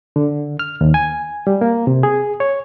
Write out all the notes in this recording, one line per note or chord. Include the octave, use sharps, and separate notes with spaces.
D3
F6
D#2
G#5
G3
A#3
C3
G#4
C#5